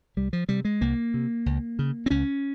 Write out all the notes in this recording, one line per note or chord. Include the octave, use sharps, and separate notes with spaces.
C2 G3
F3
C3 G3
G#3
C2 A#3
C3
C#2
C#3
C4
C#2 C#4